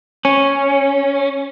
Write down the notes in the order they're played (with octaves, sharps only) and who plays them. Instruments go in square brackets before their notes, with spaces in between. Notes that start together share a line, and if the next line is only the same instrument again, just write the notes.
[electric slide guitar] C#4